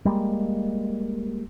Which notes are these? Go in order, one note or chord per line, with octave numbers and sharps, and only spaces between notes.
G3 G#3 A#3